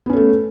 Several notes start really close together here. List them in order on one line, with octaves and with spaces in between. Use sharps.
B3 C#4 A4 A3